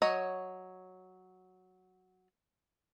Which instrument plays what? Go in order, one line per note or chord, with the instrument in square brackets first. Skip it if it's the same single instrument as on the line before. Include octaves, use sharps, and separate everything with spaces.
[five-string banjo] F#3 C#5 D#5